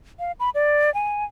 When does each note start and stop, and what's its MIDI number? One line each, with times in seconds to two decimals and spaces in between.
0.19 0.32 77
0.40 0.50 83
0.55 0.93 74
0.94 1.24 80